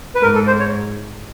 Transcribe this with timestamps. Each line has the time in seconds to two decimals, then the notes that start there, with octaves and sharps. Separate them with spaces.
0.15 B4
0.22 G#2 A#4
0.35 A4
0.47 C5
0.60 C#5